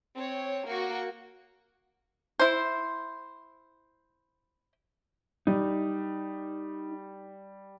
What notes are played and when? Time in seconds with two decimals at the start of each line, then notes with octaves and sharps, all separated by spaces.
0.16 C4 C#5
0.66 A#3 F#4 C#6
2.39 E4 C5
5.47 G3 D#4